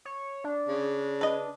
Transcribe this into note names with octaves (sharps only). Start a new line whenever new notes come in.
C#5
D4
C#3
B4 D#5